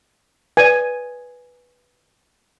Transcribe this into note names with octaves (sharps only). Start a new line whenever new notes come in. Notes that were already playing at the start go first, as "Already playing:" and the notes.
B4 D5 G#5